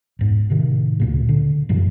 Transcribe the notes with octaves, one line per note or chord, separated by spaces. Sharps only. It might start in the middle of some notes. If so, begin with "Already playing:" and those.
E1 G#2
A2 C3 D#3
D2 A#2 C#3
D3
F#2 A#2 E3 G3